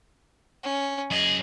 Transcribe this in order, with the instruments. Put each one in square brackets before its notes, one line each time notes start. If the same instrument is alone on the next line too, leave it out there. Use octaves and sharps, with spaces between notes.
[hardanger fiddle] C#4
[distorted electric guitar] F#2 G#4 [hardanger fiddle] D#5